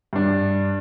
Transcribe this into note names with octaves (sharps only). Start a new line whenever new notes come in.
G2 D4